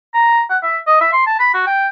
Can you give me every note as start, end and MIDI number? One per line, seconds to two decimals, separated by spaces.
0.14 0.41 82
0.50 0.58 78
0.63 0.77 76
0.87 0.98 75
1.01 1.11 76
1.12 1.23 84
1.27 1.37 81
1.40 1.49 83
1.54 1.63 66
1.67 1.85 79